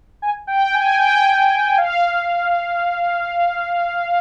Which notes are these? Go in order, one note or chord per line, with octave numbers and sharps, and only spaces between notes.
G#5
G5
G#5
G5
F5